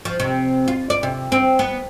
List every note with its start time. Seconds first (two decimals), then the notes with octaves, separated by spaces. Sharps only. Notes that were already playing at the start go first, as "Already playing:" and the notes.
0.05 F3
0.20 C3
0.68 F4
0.90 D5
1.03 C3
1.32 C4
1.59 B3